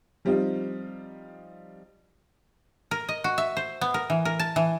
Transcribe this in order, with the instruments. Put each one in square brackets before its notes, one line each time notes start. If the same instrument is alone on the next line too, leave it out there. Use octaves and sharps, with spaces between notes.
[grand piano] F3 G3 C4 D#4 F4
[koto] A#4
D#5
F#4
E5
C5
B3
A#4
E3
A#4
A5
E3